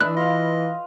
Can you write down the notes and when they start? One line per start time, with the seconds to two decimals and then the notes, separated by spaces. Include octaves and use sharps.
0.01 E3 D4 B4 D#5 E5 F#6
0.17 F4 D#5 F5